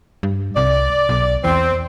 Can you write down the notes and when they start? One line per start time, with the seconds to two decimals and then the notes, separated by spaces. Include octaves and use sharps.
0.23 G2
0.57 C2 D5
1.09 B1
1.44 E2 C4